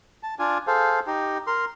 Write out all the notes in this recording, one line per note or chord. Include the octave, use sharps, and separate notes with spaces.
A5
D4 F4 G#5
G#4 A4 C5 F5
D#4 G4
A#4 C6